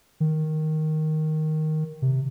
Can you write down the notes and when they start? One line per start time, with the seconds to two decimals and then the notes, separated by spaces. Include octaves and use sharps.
0.20 D#3
2.02 C3